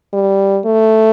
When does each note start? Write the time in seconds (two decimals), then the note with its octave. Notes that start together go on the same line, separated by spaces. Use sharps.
0.13 G3
0.65 A3